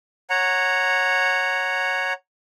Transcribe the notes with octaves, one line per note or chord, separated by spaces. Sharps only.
C#5 F#5 A#5